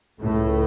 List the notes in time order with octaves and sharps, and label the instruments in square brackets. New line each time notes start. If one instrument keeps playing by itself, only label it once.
[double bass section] C#2 A2 C#3 A3